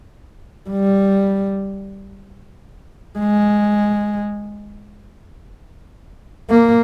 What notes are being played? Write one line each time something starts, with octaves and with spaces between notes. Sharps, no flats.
G3
G#3
A#3